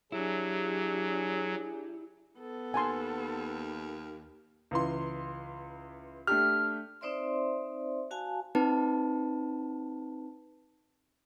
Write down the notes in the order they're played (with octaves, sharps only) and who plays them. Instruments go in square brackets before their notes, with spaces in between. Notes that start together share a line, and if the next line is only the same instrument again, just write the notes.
[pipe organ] F#3 [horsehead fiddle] D4 G4 [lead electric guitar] E4 [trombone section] G#4
[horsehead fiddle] B3 A4
[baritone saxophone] D#2 [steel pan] G#5 A5 C6
[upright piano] C#2 E3 C6
[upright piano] A3 D4 G4 [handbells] F6
[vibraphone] C4 D#4 C5 D5 E5 C6
F#4 F5 G#5 A5
[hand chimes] C4 D#4 B4 A5